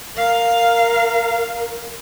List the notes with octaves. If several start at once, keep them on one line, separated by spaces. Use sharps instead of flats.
A#4 F5